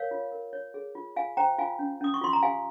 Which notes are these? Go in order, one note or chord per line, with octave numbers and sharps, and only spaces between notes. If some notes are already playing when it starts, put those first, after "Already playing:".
Already playing: A#4 C#5 F5
F4
A#4
C#5
G#4
F4
F4 F5 G#5
C5 G5 A#5
F4 F5 G#5
C#4
C#4 D#6
C#6
F4 C6
A#5
G4 F5 G#5